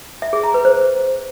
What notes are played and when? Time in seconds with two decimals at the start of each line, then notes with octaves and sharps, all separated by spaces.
0.22 E5
0.33 G#4
0.44 A#5
0.54 B4
0.65 C5